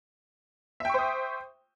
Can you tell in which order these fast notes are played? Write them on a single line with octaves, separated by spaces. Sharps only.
E5 G5 C#6 C5 D#6